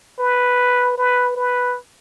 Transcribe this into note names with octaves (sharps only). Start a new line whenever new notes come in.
B4
B4
B4